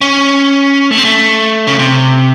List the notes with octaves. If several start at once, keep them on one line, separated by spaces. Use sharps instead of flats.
C#4
A3
C4
A3
C#3
C3